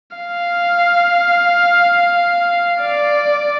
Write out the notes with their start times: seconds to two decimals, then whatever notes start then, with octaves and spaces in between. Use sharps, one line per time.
0.17 F5
2.82 D5